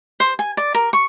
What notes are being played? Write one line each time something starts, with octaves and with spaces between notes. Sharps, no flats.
C5
G#5
D5
A#4
C#6